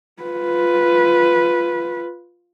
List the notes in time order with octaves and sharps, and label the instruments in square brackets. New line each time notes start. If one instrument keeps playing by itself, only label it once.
[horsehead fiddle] F4 B4